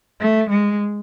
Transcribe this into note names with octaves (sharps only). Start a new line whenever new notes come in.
A3
G#3